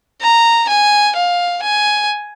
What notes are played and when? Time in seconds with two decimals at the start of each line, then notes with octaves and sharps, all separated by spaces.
0.21 A#5
0.68 G#5
1.16 F5
1.63 G#5